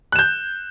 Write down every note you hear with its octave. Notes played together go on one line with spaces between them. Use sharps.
F#6 G6 E7